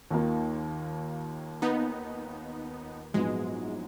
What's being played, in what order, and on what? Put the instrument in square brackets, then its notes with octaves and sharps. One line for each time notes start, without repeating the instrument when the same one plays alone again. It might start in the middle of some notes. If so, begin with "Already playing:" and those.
[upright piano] D#2 D#3 A#3 F4
[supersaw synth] B3 D#4
[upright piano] A#1 G#2 F#3 B3 [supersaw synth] G#3